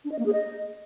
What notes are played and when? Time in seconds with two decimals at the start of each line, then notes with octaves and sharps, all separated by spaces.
0.05 D4
0.12 D#5
0.19 A#3
0.26 G#4
0.33 D#5